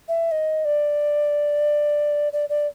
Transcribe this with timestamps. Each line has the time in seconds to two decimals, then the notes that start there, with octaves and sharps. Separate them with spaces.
0.08 E5
0.31 D#5
0.65 D5
2.33 D5
2.49 D5